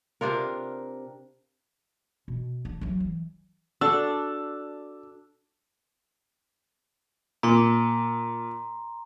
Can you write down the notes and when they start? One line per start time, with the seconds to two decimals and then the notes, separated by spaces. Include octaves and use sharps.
0.21 C3 D4 F4 A#4
2.28 B2
2.65 D4
2.81 E3 F#3
3.00 E3
3.81 D4 F#4 A4 E6
7.43 A#2 A#5 C6